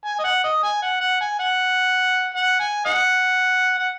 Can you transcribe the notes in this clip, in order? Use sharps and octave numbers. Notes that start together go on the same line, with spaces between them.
G#5
D#5
F#5
D#5
G#5
F#5
F#5
G#5
F#5
F#5
G#5
D#5 F#5
F#5